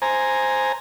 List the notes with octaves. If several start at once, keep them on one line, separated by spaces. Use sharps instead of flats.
C5 G#5 A#5